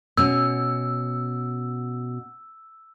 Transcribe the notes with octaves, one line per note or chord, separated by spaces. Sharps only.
B2 C#4 E6